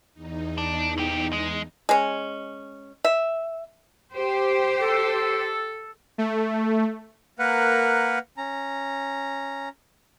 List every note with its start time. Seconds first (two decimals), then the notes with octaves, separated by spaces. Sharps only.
0.14 E2 D#4
0.58 D4
0.98 A#2 G4
1.33 G#3
1.89 G#3 C#4
3.04 E5
4.14 G4 C5
4.81 A4
6.18 A3
7.39 A#3 A#4 B4 F#5
8.38 C#4 A#5